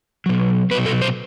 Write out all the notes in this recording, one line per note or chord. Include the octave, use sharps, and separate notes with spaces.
B2 F#3
B2 F#3 B4
A4
C5